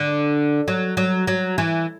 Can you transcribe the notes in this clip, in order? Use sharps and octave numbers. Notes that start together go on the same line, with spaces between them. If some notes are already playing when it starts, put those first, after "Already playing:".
Already playing: D3
F#3
F#3
F#3
E3